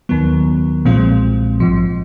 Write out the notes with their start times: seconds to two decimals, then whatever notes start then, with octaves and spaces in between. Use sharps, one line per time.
0.09 D#2 D#3 F#3 B3
0.85 B1 A#2 F3 G#3 C4
1.60 A#1 G#2 F3